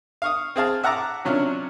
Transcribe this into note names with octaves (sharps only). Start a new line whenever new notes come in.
F5 C#6 D#6
C4 G#4 F5 A5
E5 F#5 A5 A#5 D6
C3 F#3 C#4 D4 F4